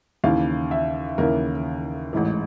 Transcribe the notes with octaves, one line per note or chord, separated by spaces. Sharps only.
D#2 C#3 E3 F5
E5
D#2 C#3 E3 A#4
A1 G#2 E3